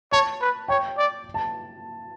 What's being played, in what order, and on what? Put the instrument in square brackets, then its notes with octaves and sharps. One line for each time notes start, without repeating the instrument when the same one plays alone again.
[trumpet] C#5 [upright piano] A5
[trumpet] B4
[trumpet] C#5 [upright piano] G5
[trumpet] D5
[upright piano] A5